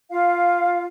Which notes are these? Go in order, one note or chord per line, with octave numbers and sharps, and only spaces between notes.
F4 F5